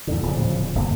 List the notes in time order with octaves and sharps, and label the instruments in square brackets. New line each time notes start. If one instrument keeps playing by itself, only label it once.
[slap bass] E2 A2 D3
D1 A#2 C#3 F3
F1 G2 D3 A#3